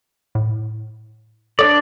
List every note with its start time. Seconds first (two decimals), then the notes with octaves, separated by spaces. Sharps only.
0.35 A2
1.59 D4 A4 C#5 D5